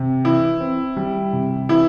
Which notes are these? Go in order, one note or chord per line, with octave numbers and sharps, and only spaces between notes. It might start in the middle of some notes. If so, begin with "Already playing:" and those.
Already playing: C3
E3 E4
C4
G3
C3
E3 E4